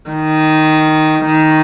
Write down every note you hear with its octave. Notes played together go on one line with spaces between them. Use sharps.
D#3
D#3